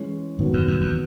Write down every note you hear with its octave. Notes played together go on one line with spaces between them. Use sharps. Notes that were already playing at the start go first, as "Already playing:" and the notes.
Already playing: E3 G#3 C#4
D#2 G#2 D#3 F#3 B3
F#2
F#2
E2